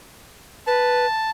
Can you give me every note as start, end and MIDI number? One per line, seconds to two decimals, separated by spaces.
0.67 1.06 71
0.67 1.30 81